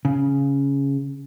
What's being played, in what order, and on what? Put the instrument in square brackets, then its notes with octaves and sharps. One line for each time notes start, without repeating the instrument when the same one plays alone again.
[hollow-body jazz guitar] C#3